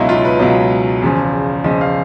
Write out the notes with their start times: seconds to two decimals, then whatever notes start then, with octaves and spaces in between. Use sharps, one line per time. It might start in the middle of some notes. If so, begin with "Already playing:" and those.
Already playing: C#2 B2 F#3 D#4 E4
0.09 F4
0.25 B4
0.40 C#2 B2 F#3 D#5
1.02 E2 C#3 F3
1.64 E2 C#3 F3 D#5
1.81 F5